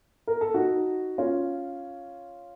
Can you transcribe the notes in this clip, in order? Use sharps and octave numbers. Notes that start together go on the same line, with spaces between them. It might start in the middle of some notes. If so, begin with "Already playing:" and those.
A#4
A4
D#4 F#4
C#4 F4